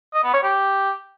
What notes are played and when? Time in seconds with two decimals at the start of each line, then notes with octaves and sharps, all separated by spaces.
0.14 D#5
0.24 B3
0.34 C#5
0.43 G4